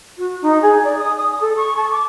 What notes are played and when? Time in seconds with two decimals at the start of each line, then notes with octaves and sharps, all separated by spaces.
0.18 F#4
0.42 D#4
0.62 G#4
0.84 D5
0.98 D#6
1.17 D#6
1.40 A4
1.56 C#6
1.77 A5
1.91 D6